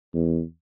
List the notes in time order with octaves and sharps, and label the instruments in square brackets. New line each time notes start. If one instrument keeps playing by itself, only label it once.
[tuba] E2